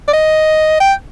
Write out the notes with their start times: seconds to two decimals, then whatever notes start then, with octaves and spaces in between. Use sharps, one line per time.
0.08 D5
0.13 D#5
0.81 G5